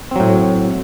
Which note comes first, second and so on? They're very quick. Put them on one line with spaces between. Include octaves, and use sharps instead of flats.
C4 F#3 A2